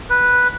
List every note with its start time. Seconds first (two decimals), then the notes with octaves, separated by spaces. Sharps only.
0.10 B4